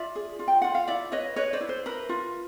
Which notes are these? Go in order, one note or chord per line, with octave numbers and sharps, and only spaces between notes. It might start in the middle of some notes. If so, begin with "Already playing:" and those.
Already playing: F4 D5 E5
G#4
F4
G5
F4 F#5
F5
E4 D5 E5
B4 C#5 D#5
B4 C#5 D#5
C5 D5
E4
C5
A#4 B4
F4